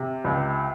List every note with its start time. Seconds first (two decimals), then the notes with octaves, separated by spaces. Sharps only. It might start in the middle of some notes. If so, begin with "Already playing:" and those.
Already playing: C3
0.24 C#2